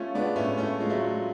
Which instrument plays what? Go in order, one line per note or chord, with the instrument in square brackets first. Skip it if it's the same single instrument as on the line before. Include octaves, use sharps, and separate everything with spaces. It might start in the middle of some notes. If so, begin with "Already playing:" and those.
Already playing: [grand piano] A3 C#4 [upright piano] F4
[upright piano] G#3 [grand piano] B3 D4
[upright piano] A2 [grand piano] A3 C#4
[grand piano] A3 C#4 [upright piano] F4
[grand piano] G#3 [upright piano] F4
[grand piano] F#3 A3
[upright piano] F4